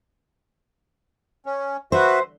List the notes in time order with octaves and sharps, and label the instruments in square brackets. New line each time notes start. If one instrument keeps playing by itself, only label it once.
[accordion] C#4
[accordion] F#4 B4 E5 [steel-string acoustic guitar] C5